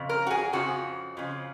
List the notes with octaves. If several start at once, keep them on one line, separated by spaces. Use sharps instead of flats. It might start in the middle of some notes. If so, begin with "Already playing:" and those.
Already playing: F2 C#3
A#4
F#4
G#4
F2 C#3 F3 F#4
F2 C#3 F3